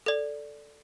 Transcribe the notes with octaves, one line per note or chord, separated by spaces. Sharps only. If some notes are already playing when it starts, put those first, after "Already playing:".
A4 D5